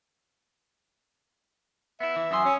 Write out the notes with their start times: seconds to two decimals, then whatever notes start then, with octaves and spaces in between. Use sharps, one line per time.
2.00 B3 E4 E5
2.16 E3
2.31 F#2 F#3 G#5 C6 D#6 E6
2.45 C#4